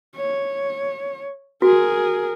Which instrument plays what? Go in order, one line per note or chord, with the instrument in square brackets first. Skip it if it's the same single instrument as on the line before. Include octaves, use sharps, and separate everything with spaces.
[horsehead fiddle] C#5
[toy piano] F#4 [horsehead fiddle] G#4 A#4